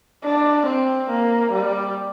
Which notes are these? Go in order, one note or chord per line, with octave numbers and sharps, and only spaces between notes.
D4
C4
A#3
G3